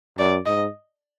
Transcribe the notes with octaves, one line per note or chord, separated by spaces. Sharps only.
F#2 D5
G#2 D#5